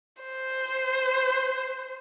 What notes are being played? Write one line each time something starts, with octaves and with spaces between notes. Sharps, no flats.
C5